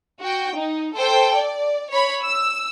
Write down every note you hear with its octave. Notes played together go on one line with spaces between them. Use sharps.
F#4 G5
D#4
A4 C5 G5
D5
C#5 B5
E6